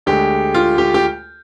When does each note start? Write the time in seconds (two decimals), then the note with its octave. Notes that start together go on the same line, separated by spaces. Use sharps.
0.06 D2 D3 G#3 G4
0.54 F4
0.78 G4
0.94 G4